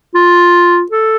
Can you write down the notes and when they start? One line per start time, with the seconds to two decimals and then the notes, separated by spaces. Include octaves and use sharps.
0.15 F4
0.91 A4